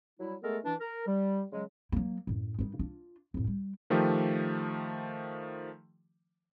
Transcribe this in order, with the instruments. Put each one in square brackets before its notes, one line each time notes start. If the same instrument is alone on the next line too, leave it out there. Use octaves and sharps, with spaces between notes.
[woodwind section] F#3 G3 E4
G#3 A3 B3 A4 A#4
E3 D4
A#4
G3
C#3 F#3 G#3
[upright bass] F#3 A#3
F#2 A2
G2 D#3
D4 F4
F2 A2
G3
[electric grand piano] D#3 F3 A3 G4